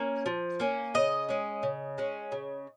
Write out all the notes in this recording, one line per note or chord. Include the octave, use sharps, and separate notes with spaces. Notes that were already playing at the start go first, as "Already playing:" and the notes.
Already playing: A#3 C#4
F3
A#3 C#4
C#3 D#5
G#3 C#4
C#3
G#3 C#4
C#3